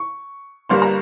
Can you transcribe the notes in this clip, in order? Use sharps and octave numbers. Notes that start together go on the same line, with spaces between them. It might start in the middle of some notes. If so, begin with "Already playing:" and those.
Already playing: C#6
G1 G2 G3 A#3 C6
A#5